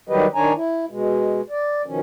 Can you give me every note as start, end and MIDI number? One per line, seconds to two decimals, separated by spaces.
0.09 0.26 51
0.09 0.26 54
0.09 0.26 55
0.09 0.26 67
0.09 0.26 71
0.09 0.26 75
0.35 0.53 51
0.35 0.53 62
0.35 0.53 73
0.35 0.53 80
0.35 0.53 82
0.55 0.85 64
0.90 1.41 47
0.90 1.41 56
1.50 1.82 74
1.86 2.00 47
1.86 2.00 51
1.86 2.00 53
1.86 2.00 61